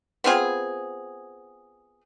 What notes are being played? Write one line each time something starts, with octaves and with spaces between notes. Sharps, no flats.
B3 C4 F4 G#4